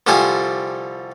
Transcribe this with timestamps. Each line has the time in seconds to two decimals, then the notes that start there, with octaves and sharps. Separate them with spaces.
0.07 C2 D3 F3 G3 C5 G#5